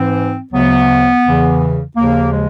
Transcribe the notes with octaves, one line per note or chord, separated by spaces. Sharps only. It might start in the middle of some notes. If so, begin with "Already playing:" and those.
Already playing: G#2 E3 C4
D2 C#3 F#3 B3
E2 C#3 E3
D#2 C#3 F3 A#3
G#3